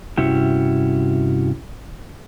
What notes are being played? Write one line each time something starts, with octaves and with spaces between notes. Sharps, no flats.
G2 C3 C#4 E4 F#4 G4